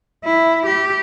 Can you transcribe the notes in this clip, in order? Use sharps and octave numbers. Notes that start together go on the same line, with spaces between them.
E4
G4